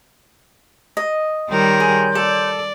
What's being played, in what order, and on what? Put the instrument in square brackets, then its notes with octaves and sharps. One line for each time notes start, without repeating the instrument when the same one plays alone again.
[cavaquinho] D#5
[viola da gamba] D#3 G3 A#4 [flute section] C#5 C6 G6
[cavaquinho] G#4
[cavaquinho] A4 [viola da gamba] D5